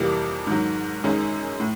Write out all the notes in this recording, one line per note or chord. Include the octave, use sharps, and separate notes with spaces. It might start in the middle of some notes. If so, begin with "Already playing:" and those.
Already playing: F2 C3 E3 G3 A#3
G#2 D#3 F#3
F#2 D#3 G#3 C#4
A2